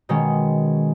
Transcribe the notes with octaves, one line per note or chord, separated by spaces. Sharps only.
B2 D#3 G#3 C#4